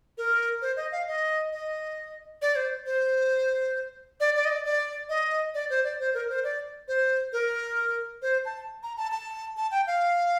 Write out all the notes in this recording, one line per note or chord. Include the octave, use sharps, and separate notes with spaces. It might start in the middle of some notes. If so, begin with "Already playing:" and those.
A#4
C5
D#5
F5
D#5
D#5
D5
C5
C5
D5
D5
D#5
D5
D5
D#5
D5
C5
D5
C5
A#4
C5
D5
C5
A#4
C5
A5
A#5
A5
A5
A5
G5
F5